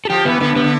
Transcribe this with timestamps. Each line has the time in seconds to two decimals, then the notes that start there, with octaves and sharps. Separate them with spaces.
0.05 A4
0.10 F3 G4
0.25 E3 B3
0.40 D3 B3
0.53 C3 B3
0.64 D3